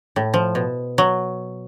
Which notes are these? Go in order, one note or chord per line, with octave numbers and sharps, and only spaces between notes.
A2
F3
B2
F#3